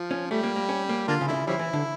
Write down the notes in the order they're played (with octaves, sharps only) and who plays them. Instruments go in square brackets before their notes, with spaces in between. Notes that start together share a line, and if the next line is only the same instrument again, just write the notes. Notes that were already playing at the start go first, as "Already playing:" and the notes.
Already playing: [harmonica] F3
[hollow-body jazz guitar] C#4
[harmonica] G3 [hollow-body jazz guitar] A3
[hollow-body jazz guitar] A#3
A#3
C#4
A#3
[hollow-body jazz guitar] D3 [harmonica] A#3 D4 F4
[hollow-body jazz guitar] C#3
[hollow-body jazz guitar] D3 [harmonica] E4
[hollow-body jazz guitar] C#3
[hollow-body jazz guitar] F3 [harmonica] G3 C#4 E4
[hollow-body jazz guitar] E3
D3